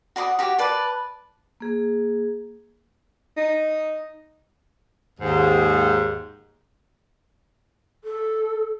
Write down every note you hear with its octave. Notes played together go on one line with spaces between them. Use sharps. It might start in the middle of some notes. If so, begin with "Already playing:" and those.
F#4 D5 B5 D#6
F#4 G4 C#5
B4 D5 A5
A#3 G#4
D#4
D#2 G#2
A4